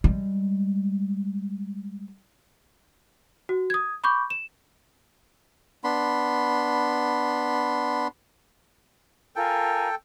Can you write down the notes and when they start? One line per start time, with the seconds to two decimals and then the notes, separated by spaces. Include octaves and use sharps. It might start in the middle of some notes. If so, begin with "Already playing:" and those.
0.04 G3 G#3
3.49 F#4
3.70 D#6 G#6
4.04 B5 C#6 D6 G6
4.30 E7
5.84 B3 D4 B5 C6
9.36 F4 A4 A#4 G5 G#5